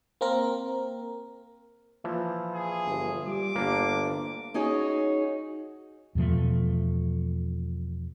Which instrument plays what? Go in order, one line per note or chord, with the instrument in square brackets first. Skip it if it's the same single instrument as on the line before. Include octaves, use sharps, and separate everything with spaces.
[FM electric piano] A#3 C4 A#4
[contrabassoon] A#2 [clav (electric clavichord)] E3 F3
[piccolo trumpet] G#4
[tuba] G1
[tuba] G3 [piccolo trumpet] D6
[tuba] G1 [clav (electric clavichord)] A#3 D4
[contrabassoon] D2
[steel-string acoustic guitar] C#4 D#4 F#4 G#4 C#5
[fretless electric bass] E2 B2 F3 A3